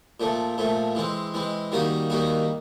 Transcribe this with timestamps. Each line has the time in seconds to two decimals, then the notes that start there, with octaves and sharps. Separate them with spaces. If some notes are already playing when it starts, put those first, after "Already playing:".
0.20 A#2 F3 A3
0.58 A#2 F3 A3
0.95 E3 G#3 C4
1.34 E3 G#3 C4
1.72 D#3 G3 A#3 D#4 F#4
2.10 D#3 G3 A#3 D#4 F#4